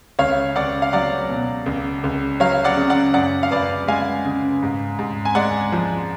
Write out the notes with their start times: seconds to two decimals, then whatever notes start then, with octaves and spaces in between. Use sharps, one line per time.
0.19 C#2 C#5 F5
0.56 C#2 D5 F#5
0.82 F5
0.93 F#3 D5 F#5
1.30 B2
1.66 C#2
2.04 C#2
2.40 F#3 C#5 F5
2.64 D5 F#5
2.77 C#3
2.90 D5 F#5
3.14 F#2 D5 F#5
3.43 F5
3.51 F#2 B4 D5
3.87 G#3 F5 G#5
4.25 C#3
4.62 G#2
4.99 G#2
5.25 G#5
5.35 G#3 D5 F#5
5.72 F3